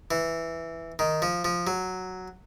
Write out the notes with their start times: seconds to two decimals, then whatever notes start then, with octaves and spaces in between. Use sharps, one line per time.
0.11 E3
0.99 D#3
1.22 F3
1.45 F3
1.67 F#3